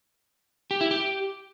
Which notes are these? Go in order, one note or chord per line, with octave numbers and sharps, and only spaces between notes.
G4
E4
G4